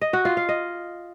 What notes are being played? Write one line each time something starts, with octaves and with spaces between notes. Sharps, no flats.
D#5
F#4
F4
F5
D#5